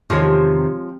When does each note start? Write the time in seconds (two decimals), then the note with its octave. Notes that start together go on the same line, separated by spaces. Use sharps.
0.10 E2 C3 D#3 F3 G#3 C#5